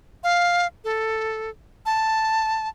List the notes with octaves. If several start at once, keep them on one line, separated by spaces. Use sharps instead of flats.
F5
A4
A5